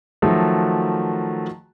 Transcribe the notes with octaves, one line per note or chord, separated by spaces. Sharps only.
D#3 F3 F#3 A3 F#4